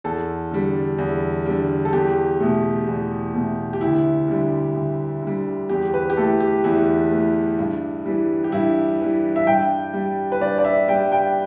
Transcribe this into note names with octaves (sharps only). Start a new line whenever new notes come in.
E2 A4
D3 G3
E2
D3 G3
A4
E2 G4
B2 A3
E2
B2 A3
G4
D2 E4
D3 G3
D2
D3 G3
E2 G4
B4
G4
E3 A3 A4
G4
E2 E4
E3 A3
G2
E3 G3
G4
G2 E4
E3 G3
E5
G2 G5
G3
B4
G2 D5
D5
E5
G3 G5
G5